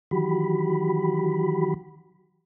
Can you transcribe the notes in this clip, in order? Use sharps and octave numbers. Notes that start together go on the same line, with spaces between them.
D#3 E3 F#3 F#4 G4 B5